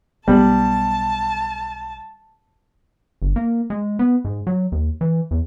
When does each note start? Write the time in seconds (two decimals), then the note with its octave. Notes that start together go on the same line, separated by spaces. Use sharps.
0.28 B1 G3 B3 A5
3.22 G1
3.36 A#3
3.70 G#3
3.99 B3
4.25 G#2
4.47 F#3
4.72 D#2
5.01 E3
5.31 E2